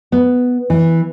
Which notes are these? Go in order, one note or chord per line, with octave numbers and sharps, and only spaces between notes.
B3
E3